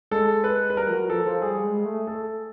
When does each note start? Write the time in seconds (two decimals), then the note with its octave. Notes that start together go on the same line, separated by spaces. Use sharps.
0.11 G#3 A4
0.44 B4
0.70 B4
0.76 G3 A#4
0.88 F3
0.93 F#3
1.09 F3 A4
1.25 F3
1.42 G3 G#4
1.64 G#3
1.85 A3
2.07 A4